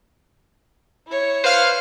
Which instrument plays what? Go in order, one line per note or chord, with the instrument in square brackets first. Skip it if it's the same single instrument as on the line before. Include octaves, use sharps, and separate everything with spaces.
[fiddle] E4 C#5
[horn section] B4 C5 F5